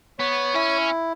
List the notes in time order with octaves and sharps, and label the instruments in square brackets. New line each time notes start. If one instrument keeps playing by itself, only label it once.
[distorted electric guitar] B3 [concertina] C#5
[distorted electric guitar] C#4 [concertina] E4